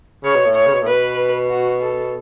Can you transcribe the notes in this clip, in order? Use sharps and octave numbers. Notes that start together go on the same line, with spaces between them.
C#3 C#5
B2
A2
C#5
C#3
B2
A2
B2 B4
F#4
A4